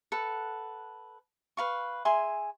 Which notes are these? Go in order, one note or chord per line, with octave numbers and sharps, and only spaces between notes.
A4 B4 F#5
B4 F5 C#6
G#4 E5 G#5 C6